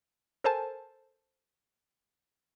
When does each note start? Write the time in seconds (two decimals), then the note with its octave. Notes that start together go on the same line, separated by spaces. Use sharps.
0.44 A4 A#4 C5 G#5 A5